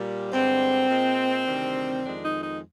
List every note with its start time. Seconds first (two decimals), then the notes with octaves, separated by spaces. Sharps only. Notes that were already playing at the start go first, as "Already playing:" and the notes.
Already playing: A#2 G3
0.31 G2 D3 G#3 C4
0.90 A#2 G#3
1.47 D2 C3 D#3 G3
2.04 F2 D#3 G#3 D4
2.24 D#4
2.42 D#4